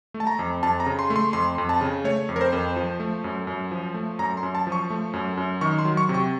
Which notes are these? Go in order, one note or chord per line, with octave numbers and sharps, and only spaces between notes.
A3
A5
A#5
F2
F2 A5
A#5
C#3
C6
A3
C6
F2 C6
F2
A5
C#3
A3 C#5
F2
A#4
C5
F2
F3
A3
F#2
F#2
F3
A3
F#2 A#5
C6
F#2
A5
F3
C#6
A3
F#2
F#2
D#3 C#6
C6
F#3
C#6
C3
C#6